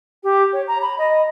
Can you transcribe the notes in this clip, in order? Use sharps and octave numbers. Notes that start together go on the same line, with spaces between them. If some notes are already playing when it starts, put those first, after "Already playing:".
G4
C#5
A#5
B5
D#5